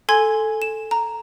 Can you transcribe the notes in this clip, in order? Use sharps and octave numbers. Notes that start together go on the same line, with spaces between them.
A4 G#5 C6 G#6
E7
A#5